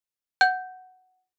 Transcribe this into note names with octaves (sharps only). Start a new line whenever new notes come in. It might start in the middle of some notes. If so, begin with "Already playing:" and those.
F#5 G6